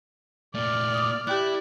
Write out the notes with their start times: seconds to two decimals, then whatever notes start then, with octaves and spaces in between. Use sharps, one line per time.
0.55 A#2 A3 D5 F6
0.94 D6 D#6
1.27 E4 G4 D5 G5 F#6